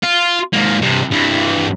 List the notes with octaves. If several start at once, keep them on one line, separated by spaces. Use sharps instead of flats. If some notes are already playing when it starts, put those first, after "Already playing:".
F4
G#2 A#3
G2 C3
G2 E3